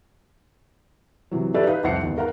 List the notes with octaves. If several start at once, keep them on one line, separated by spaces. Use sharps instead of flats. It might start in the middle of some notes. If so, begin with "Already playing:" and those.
C3 E3 F#3
F#4 G4 A4 B4 D5 E5
D#4 B4 F5
C2 F2 C4 F#5 C7 C#7
G1 D#2
A#4 F5 F#5 A#5